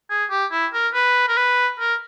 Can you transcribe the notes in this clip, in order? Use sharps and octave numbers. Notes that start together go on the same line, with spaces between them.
G#4
G4
E4
A#4
B4
A#4
B4
A#4